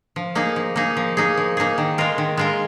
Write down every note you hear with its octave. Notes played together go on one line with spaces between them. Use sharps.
F3
A#3 D#4 G#4
F3
A#3 D#4 G#4
F3
A#3 D#4 G#4
F3
A#3 D#4 G#4
D#3
G#3 F4 A#4
D#3
G#3 F4 A#4